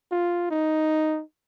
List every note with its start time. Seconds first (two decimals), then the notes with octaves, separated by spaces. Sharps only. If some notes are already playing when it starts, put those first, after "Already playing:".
0.11 F4
0.51 D#4